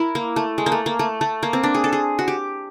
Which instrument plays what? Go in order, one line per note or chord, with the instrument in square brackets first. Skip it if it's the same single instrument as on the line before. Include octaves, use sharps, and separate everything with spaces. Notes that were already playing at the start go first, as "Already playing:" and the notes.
Already playing: [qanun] E4 A#4
A#3
A3
G#3
A#3
A3
A#3
A3
A3
A#3
C4
D4
G#4
A4
G#4
F#4
G4